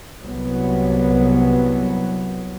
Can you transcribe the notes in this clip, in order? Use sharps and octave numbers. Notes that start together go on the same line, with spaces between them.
C2 F#3 B3